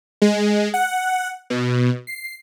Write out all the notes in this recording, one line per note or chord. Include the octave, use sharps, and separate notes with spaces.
G#3
F#5
B2
C7